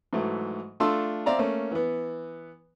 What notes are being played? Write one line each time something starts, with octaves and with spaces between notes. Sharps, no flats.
G#2 E3 F#3 A3
A3 D4 F4 A4 C6 E6
C4 D5 E5 F5 A#5
A3 A#3 C#4
E3 B3